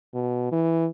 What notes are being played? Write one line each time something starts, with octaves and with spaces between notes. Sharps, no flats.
B2
E3